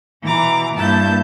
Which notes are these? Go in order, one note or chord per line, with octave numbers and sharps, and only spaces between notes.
B2 E3 A#5 D6
G2 A#3 E4 A5 G6